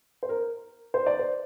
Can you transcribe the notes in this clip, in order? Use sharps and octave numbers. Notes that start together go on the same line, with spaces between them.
C5
A#4
C5
D5
C5